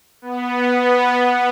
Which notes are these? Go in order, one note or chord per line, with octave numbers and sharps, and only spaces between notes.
B3
B3
B3